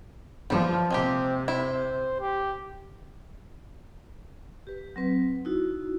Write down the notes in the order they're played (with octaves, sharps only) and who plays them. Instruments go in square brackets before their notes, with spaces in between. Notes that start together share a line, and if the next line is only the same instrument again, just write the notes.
[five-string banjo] E3 G3 [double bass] F3
[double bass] C3 [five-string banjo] G#3 A#3 G4 [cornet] C4
[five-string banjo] C4 E4 [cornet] C5
[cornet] G4
[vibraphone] G4 B4
F#3 C4 B4
D#4 E4 F#4